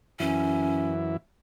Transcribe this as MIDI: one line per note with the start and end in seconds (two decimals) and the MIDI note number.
0.20 1.17 42
0.20 1.17 52
0.20 0.92 61
0.20 1.17 64